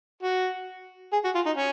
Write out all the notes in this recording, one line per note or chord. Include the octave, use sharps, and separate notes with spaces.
F#4
G#4
F#4
F4
D#4
C#4